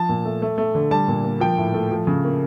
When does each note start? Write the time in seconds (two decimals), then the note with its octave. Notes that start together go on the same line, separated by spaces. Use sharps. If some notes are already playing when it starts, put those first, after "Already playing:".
Already playing: F3 A5
0.09 A#2
0.25 A3
0.42 A3
0.58 A3
0.75 D3
0.91 G3 A5
1.08 A#2
1.24 A#3
1.40 F3 G5
1.58 A2
1.74 A3
1.91 F3
2.07 C#3
2.24 A#3